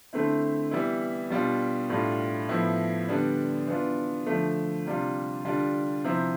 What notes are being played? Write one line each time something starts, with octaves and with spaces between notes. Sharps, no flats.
D3 A3 C4 E4
E3 G3 B3 E4
B2 G3 D4 F4
A2 G3 D4 F4
A2 F3 B3 E4
D3 G3 B3 D4
E3 B3 D4 F4
D3 F3 A3
C3 G3 D4 F4
D3 G3 D4 F4
C3 F3 C4 E4